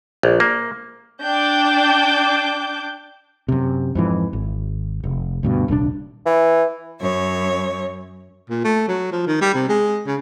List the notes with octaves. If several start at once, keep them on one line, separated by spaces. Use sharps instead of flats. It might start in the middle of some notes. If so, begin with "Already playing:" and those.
A#1
A#3
D4 G5 D6 G6
F#2 C3
F2 G#2 E3
G#1
F1
D2 G2 B2
D#1 C2 C#3 D4
E3
F#2 C#5
A#2
A3
F#3
F3
D#3
G3
C3
G#3
C#3